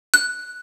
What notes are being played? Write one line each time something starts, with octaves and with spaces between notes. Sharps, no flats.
F#6